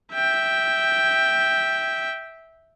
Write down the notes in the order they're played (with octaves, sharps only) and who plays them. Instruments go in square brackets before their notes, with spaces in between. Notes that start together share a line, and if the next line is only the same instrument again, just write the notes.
[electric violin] E5 G5